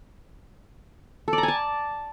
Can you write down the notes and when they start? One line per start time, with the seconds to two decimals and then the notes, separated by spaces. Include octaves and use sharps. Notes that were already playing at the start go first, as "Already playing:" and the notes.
1.28 A4
1.33 D5
1.38 A#5
1.43 G#5
1.48 A5